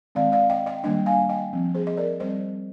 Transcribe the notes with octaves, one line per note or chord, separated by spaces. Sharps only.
D#3 G#3 C4 D5 F5
D5 F5
D#5 G5
D#5 G5
D#3 G3 A#3 D4 D#5 G5
F5 G#5
D#5 G5
F3 C4
G#4 C5
D#5
A#4 D5
G3 C4 C5 D#5